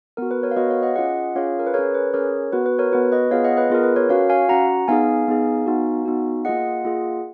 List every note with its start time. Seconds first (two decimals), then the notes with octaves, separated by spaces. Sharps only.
0.17 B3 F#4 A#4
0.31 B4
0.43 A#4 C#5
0.51 F5
0.56 B3 F#4 B4 D#5
0.69 C#5 F5
0.82 D#5 F#5
0.96 C#4 F4 G#4 D#5 F#5
1.36 C#4 F4 G#4 C#5 F5
1.59 A#4
1.67 B4
1.74 C#4 G#4 A#4 C#5
1.94 B4
2.13 C#4 G#4 A#4 C#5
2.52 B3 F#4 B4
2.66 B4
2.79 A#4 C#5
2.92 B3 F#4 B4
3.12 B4 D#5
3.31 B3 F4 G#4 C#5 F5
3.44 D#5 F#5
3.57 B4 D#5
3.70 B3 F4 G#4 A#4
3.83 B4
3.96 A#4 C#5
4.09 C#4 F#4 C#5 F5
4.29 F5 G#5
4.49 C#4 F#4 F#5 A#5
4.88 B3 D#4 G#4 F5 G#5
5.28 B3 D#4 G#4
5.66 B3 D#4 F#4
6.05 B3 D#4 F#4
6.45 A#3 F4 G#4 D#5 F#5
6.85 A#3 F4 G#4